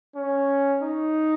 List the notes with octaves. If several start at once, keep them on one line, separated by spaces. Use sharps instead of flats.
C#4
D#4